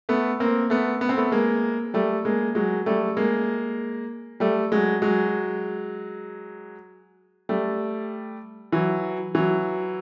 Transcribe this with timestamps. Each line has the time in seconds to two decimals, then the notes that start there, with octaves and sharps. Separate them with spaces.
0.09 A3 B3
0.40 A#3 C4
0.70 A3 B3
1.01 B3
1.09 C4
1.17 A3 B3
1.32 G#3 A#3
1.94 G3 A3
2.25 G#3 A#3
2.55 F#3 G#3
2.86 G3 A3
3.17 G#3 A#3
4.40 G3 A3
4.72 F#3 G#3
5.02 F#3 G#3
7.49 G3 A3
8.72 E3 F#3
9.35 E3 F#3